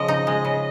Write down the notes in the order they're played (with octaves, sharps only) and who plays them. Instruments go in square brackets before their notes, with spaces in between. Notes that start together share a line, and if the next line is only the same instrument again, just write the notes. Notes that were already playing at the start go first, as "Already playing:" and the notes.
Already playing: [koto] C#3 F3 [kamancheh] D#5
[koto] D#4
G#3
C#3